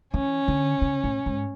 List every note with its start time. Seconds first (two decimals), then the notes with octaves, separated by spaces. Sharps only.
0.14 E3 C#4
0.48 D3
0.81 C#3
1.04 A2
1.26 G#2